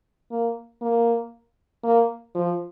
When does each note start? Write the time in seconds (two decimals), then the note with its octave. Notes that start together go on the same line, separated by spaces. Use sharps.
0.31 A#3
0.82 A#3
1.84 A#3
2.35 F3